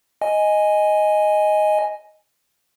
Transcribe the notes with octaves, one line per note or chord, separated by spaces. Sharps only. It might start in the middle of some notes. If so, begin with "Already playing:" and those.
D#5 G#5